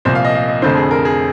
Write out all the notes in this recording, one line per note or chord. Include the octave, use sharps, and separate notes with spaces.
C2 A#2 F3 C5
F5
D#5
F5
D#5
F1 F2 D3 C5
G#4
A#4
G#4